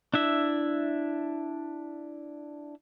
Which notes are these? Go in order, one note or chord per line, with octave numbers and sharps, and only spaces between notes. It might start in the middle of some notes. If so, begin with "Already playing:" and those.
D4 E4 E5